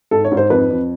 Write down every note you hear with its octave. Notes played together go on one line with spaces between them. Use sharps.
G#2 A4
C#5
G#2
C5
F2 B4
F2